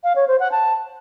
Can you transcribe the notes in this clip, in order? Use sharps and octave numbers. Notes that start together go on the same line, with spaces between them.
F5
C#5
C5
F#5
A5